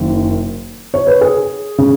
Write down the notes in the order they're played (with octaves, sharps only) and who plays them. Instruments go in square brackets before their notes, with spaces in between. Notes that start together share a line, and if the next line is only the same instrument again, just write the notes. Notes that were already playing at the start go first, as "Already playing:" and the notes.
Already playing: [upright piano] F#1 F#2 D#3
C#5
B4
G#4
C#3